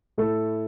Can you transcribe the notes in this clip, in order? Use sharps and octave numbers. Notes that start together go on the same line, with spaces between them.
A2 A3 E4 A4